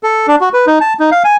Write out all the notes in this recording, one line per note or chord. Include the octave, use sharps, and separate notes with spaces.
A4
D4
F#4
B4
D#4
A5
D#4
F5
G#5